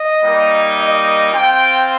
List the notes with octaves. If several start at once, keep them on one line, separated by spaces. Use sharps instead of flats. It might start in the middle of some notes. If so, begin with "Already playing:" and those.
Already playing: D#5
G3 A#3 D#4
D#5
C4 F4 G5